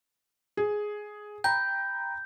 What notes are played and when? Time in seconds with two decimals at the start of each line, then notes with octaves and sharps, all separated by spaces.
0.57 G#4
1.44 G5 A#5 B5 G6